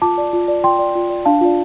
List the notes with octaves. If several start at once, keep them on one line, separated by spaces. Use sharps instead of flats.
F4 A5 D6
D5
F4
D5
F4 G5 C6
D5
F4
D5
D4 F5 A5
F4 D5